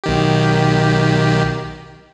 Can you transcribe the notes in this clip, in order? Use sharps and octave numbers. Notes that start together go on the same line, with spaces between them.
B1 D#3 G4